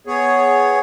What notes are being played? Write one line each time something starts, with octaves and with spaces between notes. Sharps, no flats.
B3 G#4 C#5